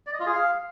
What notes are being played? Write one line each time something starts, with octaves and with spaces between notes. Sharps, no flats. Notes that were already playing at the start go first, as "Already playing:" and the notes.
D5
D#5
F4
G#4
F5